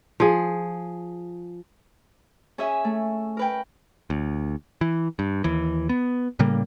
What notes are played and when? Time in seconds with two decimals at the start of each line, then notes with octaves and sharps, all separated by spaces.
0.20 F3 G#4
2.58 C#4 G#4 E5
2.84 A3
3.37 A#4 B4 G5
4.10 D2
4.81 E3
5.19 G2
5.44 D#2 E3
5.89 B3
6.39 A2 C#3 G3 A#3